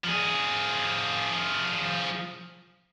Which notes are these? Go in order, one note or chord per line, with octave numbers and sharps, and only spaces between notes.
F3 G#4